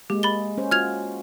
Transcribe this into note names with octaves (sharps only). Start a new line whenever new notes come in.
G#3 A#3 G4
B5 A6 G7
C#4 C5
F4 F#4 F6 G#6 F7